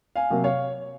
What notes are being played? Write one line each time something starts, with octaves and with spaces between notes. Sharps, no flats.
F5 G#5
C3 F#3 A#3
C#5 F5